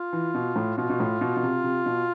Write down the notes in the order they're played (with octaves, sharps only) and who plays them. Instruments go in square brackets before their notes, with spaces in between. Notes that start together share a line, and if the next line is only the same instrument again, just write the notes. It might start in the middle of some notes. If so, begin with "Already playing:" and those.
Already playing: [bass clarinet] F4
[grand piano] E3
B2
A2
[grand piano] B2 [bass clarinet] F4
[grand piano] B2
A2
B2
B2
C3
C3
B2